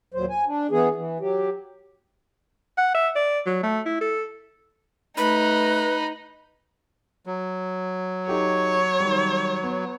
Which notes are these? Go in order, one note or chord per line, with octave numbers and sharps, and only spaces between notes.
D#2 A#2 F#3 C5
G#5
D4
E3 B3 G#4
E3
F#3 G4
F#5
E5
D5
F#3
A3
E4
A4
A3 D#4 B4 B5
F#3
D#4 G4 A4 C#5
D#3 G3
B3